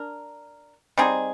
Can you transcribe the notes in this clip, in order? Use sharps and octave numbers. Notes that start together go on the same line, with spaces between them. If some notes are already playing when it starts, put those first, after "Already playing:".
Already playing: D4 A#4
G3 C4 D#4 G#4